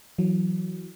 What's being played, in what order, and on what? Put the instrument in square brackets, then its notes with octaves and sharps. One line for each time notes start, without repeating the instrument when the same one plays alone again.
[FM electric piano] E3 F#3